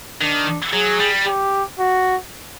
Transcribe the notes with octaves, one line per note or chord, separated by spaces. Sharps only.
D#3 D4
F#3 G#4
G3
G4
F#4